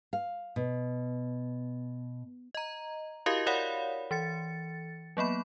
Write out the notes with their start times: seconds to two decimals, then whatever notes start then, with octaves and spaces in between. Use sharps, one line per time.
0.13 F5
0.56 B2
2.55 D#5 A#5
3.26 E4 F#4 G4 A#4 D#5 F5
3.47 A#4 C#5 D5 F5 F#5 B5
4.11 E3 A6 C#7
5.17 F#3 A#3 B3 B5